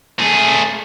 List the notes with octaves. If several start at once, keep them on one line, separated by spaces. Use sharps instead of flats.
A3 G#4